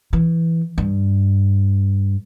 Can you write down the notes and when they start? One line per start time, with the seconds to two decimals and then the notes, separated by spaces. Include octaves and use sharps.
0.13 E3
0.78 G2